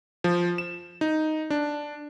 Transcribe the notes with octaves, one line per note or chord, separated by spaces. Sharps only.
F3
E7
D#4
D4